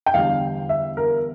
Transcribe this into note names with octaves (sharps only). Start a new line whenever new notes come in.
G5
E2 D3 G3 F5
E5
A#4